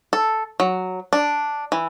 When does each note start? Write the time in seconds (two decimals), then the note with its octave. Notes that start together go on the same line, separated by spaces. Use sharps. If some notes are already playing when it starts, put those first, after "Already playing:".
0.13 A4
0.60 F#3
1.13 D4
1.72 E3